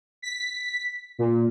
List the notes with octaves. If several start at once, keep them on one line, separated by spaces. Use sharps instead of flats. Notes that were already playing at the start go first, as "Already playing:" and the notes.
B6
A#2